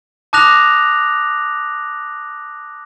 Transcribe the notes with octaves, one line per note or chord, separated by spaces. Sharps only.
A5 D6 D#6 F#6 A#6 F7